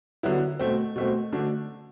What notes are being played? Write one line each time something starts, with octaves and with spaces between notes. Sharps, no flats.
D3 F#3 B3 E4
B2 A3 C4
B2 A3 C4
D3 A3 D4 F#4